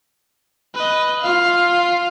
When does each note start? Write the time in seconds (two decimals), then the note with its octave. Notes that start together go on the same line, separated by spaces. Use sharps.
0.74 B4 D#5
1.22 F4 F5